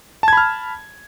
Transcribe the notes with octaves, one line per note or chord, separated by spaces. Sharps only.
A5 B5 F6 G#6